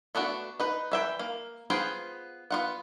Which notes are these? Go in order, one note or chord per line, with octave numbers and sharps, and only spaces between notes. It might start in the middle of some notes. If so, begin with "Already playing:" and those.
A3 B3 D4 F#4
D#4 B4
E3 E5 G5
A#3
B3 F4 G#4 C5 G5
B3 F4 F#5